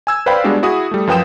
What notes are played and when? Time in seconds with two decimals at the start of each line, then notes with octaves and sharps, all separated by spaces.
0.07 G#5 E6 G#6
0.26 B4 C5 D5 F5 G5 B5
0.44 G3 G#3 B3 D4 F#4
0.63 E4 F#4 G#4 D#6
0.91 G3 A3
1.07 F#2 F3 B4 G5 D#6 E7